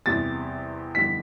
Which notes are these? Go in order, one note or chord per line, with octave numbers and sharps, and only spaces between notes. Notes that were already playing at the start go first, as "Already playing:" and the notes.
E2 C3 G3 A6
F1 E2 D3 G3 B6